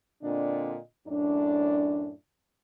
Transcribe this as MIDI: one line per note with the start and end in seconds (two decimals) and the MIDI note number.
0.23 0.76 46
0.23 0.76 50
0.23 0.76 60
0.23 0.76 62
0.23 0.76 75
1.08 2.11 42
1.08 2.11 45
1.08 2.11 62